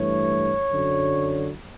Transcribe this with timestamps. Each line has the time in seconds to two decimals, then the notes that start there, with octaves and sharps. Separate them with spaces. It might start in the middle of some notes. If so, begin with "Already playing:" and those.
Already playing: G2 E3 A3 C#5
0.72 F#2 D3 F#3